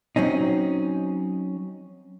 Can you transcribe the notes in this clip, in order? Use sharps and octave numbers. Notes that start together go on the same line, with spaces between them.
F#3 C4 C#4 D#4